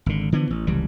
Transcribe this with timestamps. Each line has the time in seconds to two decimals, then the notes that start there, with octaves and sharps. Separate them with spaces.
0.06 G#1 D3
0.32 D3 E3 F3 B3
0.50 A1
0.67 F1 C#2 E3 G3